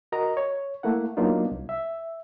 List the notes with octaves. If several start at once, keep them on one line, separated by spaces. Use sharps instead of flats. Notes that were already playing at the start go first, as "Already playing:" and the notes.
F#4 A#4 D#5 A#5
C#5
A3 A#3 E4 F#5
F#3 A#3 B3 D4 D#4 F4
C2
E5